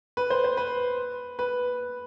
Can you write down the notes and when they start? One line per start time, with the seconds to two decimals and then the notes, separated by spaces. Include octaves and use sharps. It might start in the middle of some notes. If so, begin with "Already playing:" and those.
0.17 B4
0.30 C5
0.44 C5
0.57 B4
1.39 B4